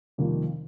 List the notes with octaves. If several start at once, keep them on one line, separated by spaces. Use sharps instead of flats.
F2 C3 D#3 G3 A#3